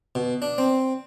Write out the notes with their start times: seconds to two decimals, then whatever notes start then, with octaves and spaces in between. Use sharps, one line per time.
0.15 B2
0.42 D4
0.58 C4